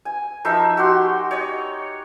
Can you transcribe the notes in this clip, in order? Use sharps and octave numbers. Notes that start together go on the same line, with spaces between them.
G#5
F3 D#4 A#4 E5
F#4 G4 C6
C#5 D#5